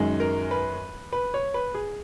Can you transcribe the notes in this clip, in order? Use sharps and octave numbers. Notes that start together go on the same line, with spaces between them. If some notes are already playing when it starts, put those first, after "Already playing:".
Already playing: F#2 D#3 G#3
A#4
B4
B4
C#5
B4
G#4